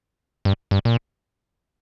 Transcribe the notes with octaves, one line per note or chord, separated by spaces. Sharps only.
G2
G2
A#2